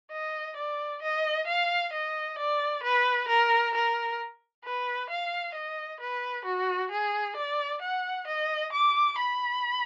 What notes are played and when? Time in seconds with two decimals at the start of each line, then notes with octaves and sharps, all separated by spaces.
0.12 D#5
0.57 D5
1.02 D#5
1.47 F5
1.93 D#5
2.38 D5
2.84 B4
3.28 A#4
3.75 A#4
4.65 B4
5.10 F5
5.55 D#5
6.00 B4
6.45 F#4
6.91 G#4
7.36 D5
7.81 F#5
8.27 D#5
8.73 D6
9.18 B5